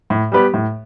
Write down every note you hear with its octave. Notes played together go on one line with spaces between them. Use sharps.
A2
G3 B3 G4 B4
A2